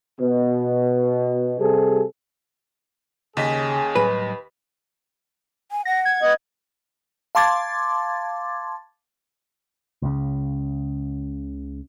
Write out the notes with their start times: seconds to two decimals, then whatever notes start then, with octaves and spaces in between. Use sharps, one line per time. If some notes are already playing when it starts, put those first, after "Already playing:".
0.21 B2
1.59 C3 G3 C4 G#4 A4
3.37 D#2 C#3 C#4 G#4 D#5 B6
3.96 A2 F#3 G3 B4
5.71 G#5
5.85 F#5 A#6
6.05 G#6
6.22 B3 D#5 F#5
7.35 F5 A5 C6 D6 G#6 A6
10.02 C#2 C#3